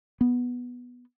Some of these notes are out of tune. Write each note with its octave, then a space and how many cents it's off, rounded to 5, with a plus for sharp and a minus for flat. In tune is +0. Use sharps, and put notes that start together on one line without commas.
B3 -5